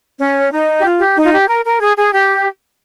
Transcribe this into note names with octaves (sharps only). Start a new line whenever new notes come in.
C#4
D#4
G4
F4
G4
D#4
F4
G4
A#4
A#4
G#4
G#4
G4